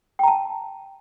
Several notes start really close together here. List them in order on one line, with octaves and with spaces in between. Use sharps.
G5 A#5 A5